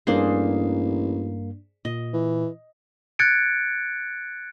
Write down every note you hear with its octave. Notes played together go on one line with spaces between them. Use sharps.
A1 G2 A#3 D4 G#4 C5 C7
A#2 D#5
E3
F#6 G#6 A6 C#7 D7